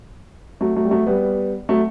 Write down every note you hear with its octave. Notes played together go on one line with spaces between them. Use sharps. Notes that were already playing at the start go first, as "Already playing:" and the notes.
F#3 A3
F#3 A3
G3
F#3 A3
G3 B3
F#3 A3